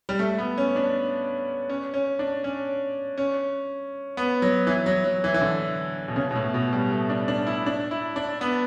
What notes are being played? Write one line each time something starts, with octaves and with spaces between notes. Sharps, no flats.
G3
A3
B3
C#4
D4
C#4
C#4
D4
C#4
C#4
B3
F#3
E3
F#3
F#3
E3
E3
D3
B2
C#3
B2
A2
B2
G3
A3
D4
D4
E4
D4
E4
D4
B3